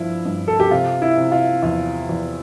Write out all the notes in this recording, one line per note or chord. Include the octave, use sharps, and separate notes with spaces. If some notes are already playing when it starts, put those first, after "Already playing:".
Already playing: G2 F3 E4
G2
A4
G4
C3 F4
E4
C3
F4
E2 F4
E2